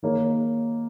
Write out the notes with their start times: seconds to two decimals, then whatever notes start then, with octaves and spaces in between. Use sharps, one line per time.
0.03 D#3 A#3 D#4 G#4 C#5